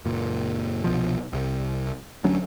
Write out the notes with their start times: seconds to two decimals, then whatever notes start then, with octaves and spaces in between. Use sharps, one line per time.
0.05 F#1 A#2
0.84 C2 B2 F3
1.33 C2
2.24 D2 F#3 C#4 D4